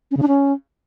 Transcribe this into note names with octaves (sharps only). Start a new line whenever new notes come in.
C#4
C#3
D4
C#4